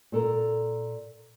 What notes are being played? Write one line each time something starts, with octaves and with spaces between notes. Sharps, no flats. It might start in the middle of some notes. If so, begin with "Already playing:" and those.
A#2 A4 A#4